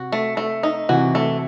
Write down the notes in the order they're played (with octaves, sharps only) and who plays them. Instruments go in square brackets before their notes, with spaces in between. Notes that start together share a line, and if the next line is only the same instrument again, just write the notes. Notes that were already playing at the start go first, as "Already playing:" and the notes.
Already playing: [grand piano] C3 [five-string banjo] F#4
[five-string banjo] A3
A3
D#4
[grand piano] C3 E3 [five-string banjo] F#4
[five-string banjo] A3